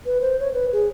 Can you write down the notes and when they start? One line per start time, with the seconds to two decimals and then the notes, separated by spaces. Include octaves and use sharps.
0.06 B4
0.21 C5
0.40 C#5
0.53 B4
0.73 G#4